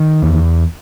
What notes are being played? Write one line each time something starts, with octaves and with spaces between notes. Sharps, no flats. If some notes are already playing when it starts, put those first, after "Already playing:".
Already playing: D#3
E2